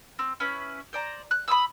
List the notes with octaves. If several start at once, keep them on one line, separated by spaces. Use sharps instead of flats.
C4
C#4 E4 B4
C5 D5 A#5
F#6
B5 C6 D#6 E6